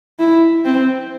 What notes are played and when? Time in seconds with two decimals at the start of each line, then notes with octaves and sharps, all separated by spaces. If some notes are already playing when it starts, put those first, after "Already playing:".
0.19 E4
0.65 C4